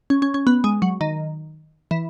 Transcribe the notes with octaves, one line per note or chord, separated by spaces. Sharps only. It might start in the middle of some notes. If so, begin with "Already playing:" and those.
C#4
C#4
C#4
B3
G#3
F#3
D#3
E3